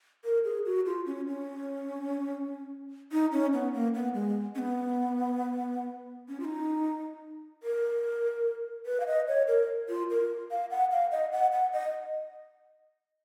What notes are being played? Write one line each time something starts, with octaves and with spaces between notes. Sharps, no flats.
A#4
G#4
F#4
F4
C#4
C#4
D#4
C#4
B3
A#3
B3
G#3
C#4
B3
C#4
F4
D#4
A#4
B4
F5
D#5
C#5
A#4
F4
A#4
F5
F#5
F5
D#5
F#5
F#5
D#5